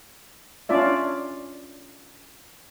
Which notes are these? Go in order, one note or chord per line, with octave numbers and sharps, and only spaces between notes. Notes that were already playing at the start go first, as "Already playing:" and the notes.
C#4 D4 F4 D5 E5